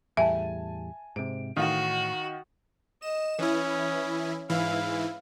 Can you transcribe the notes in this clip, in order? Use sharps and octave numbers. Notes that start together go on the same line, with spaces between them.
E2 A2 G3 E5 G#5 A5
G#2 C3 D7
A2 D#3 E3 F#4 F5 D#6
D#5 E7
E3 C#4 E4 D#6
G#2 E3 E4 F5